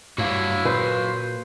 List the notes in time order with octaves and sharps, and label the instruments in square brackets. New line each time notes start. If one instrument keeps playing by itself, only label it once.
[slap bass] G2 [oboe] E4 [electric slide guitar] F#4 C#5 F5
[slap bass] A#2 [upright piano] B4 [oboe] C5